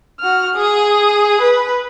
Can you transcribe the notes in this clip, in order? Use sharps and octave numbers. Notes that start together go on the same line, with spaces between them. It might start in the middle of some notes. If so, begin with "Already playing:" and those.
F#4 F6
G#4 D#6
B4